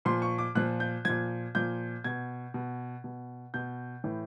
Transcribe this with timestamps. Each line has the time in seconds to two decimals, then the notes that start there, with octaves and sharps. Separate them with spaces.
0.05 A#2 F3 C6
0.22 C#6
0.38 D6
0.55 A#2 F3 F#6
0.80 G6
1.05 A#2 F3 G#6
1.55 A#2 F3 G6
2.04 B2 G#6
2.54 B2
3.04 B2
3.54 B2 G6
4.04 A2 E3